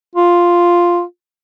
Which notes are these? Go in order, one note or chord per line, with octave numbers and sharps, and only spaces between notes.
F4